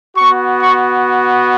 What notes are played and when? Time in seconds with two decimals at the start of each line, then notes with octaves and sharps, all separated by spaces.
0.17 B3 F#4 C#6
0.62 C#6